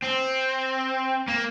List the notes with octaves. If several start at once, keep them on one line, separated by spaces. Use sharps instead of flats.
C4
A#3